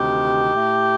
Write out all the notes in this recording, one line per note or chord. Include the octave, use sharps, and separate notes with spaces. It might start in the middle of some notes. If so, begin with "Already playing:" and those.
Already playing: D2 C3 D#3 G4
A2 A3